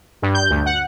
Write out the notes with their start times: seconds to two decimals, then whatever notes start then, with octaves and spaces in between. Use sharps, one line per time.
0.22 G2
0.34 G6
0.50 D2
0.66 F#5